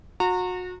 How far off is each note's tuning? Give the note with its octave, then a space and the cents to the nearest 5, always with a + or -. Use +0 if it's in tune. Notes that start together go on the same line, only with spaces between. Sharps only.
F#4 -30 A#5 -30